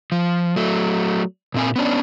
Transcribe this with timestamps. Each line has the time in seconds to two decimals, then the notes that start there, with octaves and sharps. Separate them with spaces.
0.12 F3
0.56 F#3 A3
1.54 A#2 C4 G#5
1.76 B3 C#4 D4